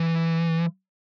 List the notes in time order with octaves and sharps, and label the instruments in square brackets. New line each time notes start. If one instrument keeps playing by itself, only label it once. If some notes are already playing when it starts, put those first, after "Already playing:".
Already playing: [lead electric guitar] E3